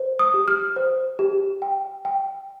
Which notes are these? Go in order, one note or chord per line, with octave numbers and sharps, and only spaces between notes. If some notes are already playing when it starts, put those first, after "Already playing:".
Already playing: C5
D#6
G4
F6
C5
G4
G5
G5